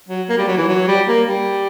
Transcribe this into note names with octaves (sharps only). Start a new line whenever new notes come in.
F#3
A#3
G3
F#3
E3
F#3
G3
A#3
G3